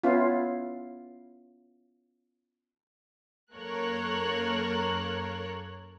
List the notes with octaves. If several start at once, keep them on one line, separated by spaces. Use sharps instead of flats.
B3 C#4 E4 F4
F#2 A#3 A4 A#4 C#5 F#6